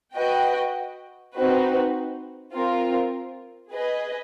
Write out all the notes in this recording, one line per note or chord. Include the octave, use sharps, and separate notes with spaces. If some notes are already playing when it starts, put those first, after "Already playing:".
F#4 B4 D#5 G5
C4 D#4 F#4 B4
C4 F4 A#4
G#4 B4 D#5